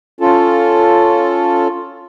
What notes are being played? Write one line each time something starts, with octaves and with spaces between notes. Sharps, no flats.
C#4 F4 A4